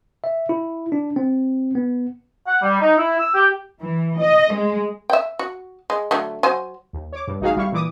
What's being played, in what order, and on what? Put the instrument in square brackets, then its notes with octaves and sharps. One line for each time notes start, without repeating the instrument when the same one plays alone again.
[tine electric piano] E5
E4
D4
C4
B3
[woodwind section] F#5
G3
D#4
E4
E6
G4
[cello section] E3
D#5
G#3
[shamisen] E5 G5
F#4
G#3
D3 F#3 A3
F#3 C5 G#5
[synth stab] D#2
C#5 D6
G2
A1 D#4 F#4 G#4 F5
G#1 G3 E4 F5 C#6
A#2 E3 D6 D#6